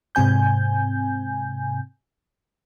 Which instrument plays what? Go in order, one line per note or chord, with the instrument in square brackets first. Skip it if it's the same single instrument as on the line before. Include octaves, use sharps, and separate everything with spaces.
[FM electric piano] G#2 C3 C4 G#5 G6